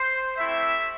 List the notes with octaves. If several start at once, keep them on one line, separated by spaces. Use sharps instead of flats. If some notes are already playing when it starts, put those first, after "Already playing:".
Already playing: C5
A3 C4 E4 G4 E5